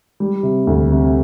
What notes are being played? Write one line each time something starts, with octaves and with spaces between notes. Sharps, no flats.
G3
C3
D2
C3